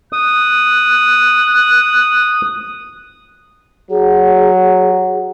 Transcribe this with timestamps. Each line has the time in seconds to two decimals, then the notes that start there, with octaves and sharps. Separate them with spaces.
0.13 D#6 F#6
3.91 F#3 G#4